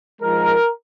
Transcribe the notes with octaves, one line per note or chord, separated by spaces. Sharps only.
G#2 F3 G#3 A#4